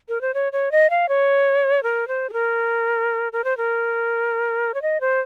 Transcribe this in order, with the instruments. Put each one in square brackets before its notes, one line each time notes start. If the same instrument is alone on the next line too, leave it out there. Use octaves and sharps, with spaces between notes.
[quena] A#4
C5
C#5
C#5
D#5
F5
C#5
A#4
C5
G#4
A#4
A#4
C5
A#4
C#5
D#5
C5